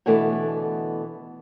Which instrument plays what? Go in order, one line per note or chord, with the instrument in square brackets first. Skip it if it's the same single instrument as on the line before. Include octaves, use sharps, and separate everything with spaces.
[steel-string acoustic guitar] B2 D3 E3 A3 B3